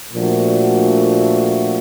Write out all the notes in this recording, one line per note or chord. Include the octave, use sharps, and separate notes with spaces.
A#2 F3 A3 D4 F#4